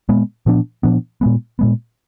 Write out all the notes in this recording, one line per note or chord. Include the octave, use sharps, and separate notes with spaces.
A#2 G#3 B3
A#2 F3 B3 D4
A#2 F3 B3 D4
A#2 G#3 B3
A#2 G#3 B3